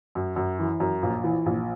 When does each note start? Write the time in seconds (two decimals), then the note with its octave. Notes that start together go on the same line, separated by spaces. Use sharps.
0.15 F#2
0.36 F#2
0.59 E3
0.80 F#2
1.03 A#1
1.24 E3
1.46 A#1